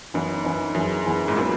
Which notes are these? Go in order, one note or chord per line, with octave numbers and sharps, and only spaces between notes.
F#2 E3 B3 D#4
E3 B3 D#4
F#2 E3 B3 E4 G#4
E3 B3 E4 G#4
G#2
A#2 F#3 B3